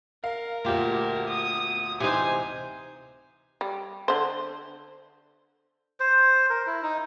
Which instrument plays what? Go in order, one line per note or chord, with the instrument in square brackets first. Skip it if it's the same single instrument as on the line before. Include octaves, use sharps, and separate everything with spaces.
[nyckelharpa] A#4 [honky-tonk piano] F5
[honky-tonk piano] D2 A#2 [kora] F4 G4
[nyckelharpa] D#6
[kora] C3 E3 D#4 [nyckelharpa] C5 G#5
[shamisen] G3
D3 C5
[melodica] C5
A#4
E4
D#4